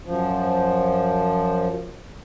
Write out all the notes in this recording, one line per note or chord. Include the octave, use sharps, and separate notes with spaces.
F#2 F3